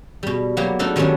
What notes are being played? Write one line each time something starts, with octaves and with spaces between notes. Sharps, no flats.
B2 G3
F#3 A#3 B3 G4
A3 B3 D4 D#4 A4 B4
D#3 F#3 G3 B3 C#4 D4